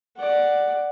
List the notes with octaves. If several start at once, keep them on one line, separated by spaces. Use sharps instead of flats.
D5 F#5